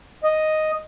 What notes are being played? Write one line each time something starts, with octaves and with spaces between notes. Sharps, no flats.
D#5